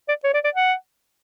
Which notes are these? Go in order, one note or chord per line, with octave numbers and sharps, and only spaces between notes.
D5
C#5
D5
D5
F#5